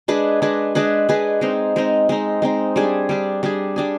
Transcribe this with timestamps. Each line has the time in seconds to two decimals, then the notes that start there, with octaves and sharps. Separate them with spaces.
0.08 G#3 D4 G#4 B4
0.42 G#3 D4 G#4 B4
0.75 G#3 D4 G#4 B4
1.09 G#3 D4 G#4 B4
1.41 G#3 C4 D#4
1.76 G#3 C4 D#4
2.09 G#3 C4 D#4
2.42 G#3 C4 D#4
2.76 G3 D4 G#4
3.09 G3 D4 G#4
3.43 G3 D4 G#4
3.76 G3 D4 G#4